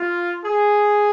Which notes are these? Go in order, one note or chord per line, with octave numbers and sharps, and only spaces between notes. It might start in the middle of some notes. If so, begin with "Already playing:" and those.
Already playing: F4
G#4